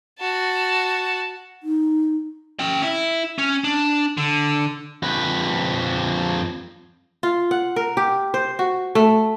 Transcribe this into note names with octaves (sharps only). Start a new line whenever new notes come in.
F#4 A5
D#4
C#4 G5
E4
C#4
D4
D3
F2 B4
F4
F#5
A#4
G4
C5
F#4
A3